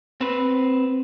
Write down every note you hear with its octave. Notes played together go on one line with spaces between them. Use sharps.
C4 B4